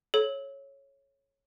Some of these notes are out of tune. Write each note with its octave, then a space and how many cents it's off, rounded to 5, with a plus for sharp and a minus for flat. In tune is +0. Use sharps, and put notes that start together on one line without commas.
A4 -30 C#5 -10